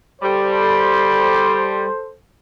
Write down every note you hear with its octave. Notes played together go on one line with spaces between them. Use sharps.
G3 A4 C5